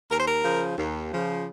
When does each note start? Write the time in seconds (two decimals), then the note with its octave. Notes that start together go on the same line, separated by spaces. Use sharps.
0.10 D#2 A#4
0.18 C5
0.24 A#4
0.44 C#3 F3
0.78 D#2
1.12 C#3 F3